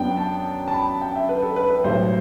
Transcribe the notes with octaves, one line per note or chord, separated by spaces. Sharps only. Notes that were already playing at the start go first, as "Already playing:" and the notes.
Already playing: F#2 F#3 B3 D4 G5
A5
A5
B5
G5
E5
B4
A4
B4
B4
B1 A2 G3 C5